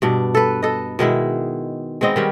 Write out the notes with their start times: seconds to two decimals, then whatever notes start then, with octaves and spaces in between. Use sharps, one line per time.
0.02 G2 B2 D4
0.35 A4 B4
0.63 A4 D#5
0.99 B2 D#3 G#3 E4
2.01 G#3 B3 C4 D#5
2.16 D#3 G3 C#4